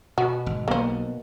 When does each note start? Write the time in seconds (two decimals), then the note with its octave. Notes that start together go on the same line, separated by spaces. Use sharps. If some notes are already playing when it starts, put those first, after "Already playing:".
0.18 B2 F#4
0.46 G#1
0.68 B1 A#3 B3 C5